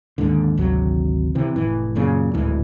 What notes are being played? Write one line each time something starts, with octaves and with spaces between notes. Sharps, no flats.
D#2 G#2 D3
G#1 D2 C3 F#3
C3 E3
F1 A2 E3
F#2 A#2 C#3
D1 D2 G#2 E3